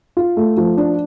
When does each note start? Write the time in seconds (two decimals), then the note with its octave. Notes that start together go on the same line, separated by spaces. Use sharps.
0.17 F4
0.37 A3
0.57 F3
0.77 D4